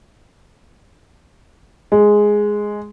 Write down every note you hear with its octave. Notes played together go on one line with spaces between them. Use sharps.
G#3